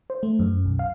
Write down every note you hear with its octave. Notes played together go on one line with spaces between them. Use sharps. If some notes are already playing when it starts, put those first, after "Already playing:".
C5
A3
F#2
B1
F5